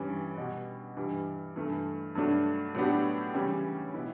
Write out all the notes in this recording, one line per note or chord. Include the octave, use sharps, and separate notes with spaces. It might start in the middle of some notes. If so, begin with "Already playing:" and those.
Already playing: G2 E3 G3 C#4
B2 G3 B3
G2 E3 G3
G2 E3 A3
G2 F#3 A3 D4
A2 F#3 B3 D4 G4
C#3 E3 G3 C#4
B2 F#3 B3 E4